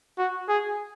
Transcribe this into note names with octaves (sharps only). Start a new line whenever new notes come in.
F#4
G#4